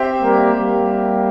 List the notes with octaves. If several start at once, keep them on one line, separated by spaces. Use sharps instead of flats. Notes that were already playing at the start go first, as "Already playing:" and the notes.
Already playing: C4 G4 C5 E5
G3 A#3
G3 A#3